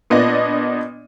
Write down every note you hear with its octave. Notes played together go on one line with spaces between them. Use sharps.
A#2 B3 D4 D5 D#5